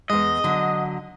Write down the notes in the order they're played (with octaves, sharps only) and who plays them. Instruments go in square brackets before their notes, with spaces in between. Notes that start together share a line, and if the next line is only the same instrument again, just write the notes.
[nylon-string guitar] E2 G#3 [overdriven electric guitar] D#5
[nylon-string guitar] D3 F#3